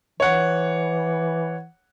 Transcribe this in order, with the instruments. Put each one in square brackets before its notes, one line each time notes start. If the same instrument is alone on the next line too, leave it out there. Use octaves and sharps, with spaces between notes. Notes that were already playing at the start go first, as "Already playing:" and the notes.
[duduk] E3 [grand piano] C#5 F#5